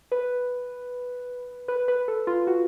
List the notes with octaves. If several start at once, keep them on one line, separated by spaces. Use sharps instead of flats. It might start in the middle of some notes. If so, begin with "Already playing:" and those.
B4
B4
B4
A4
F4
F#4